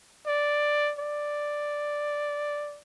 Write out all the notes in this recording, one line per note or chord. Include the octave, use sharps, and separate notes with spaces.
D5
D5